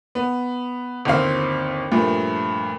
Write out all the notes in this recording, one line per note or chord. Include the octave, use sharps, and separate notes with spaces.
B3
G1 D#2 C4 F5
G2 A#2 F3 A3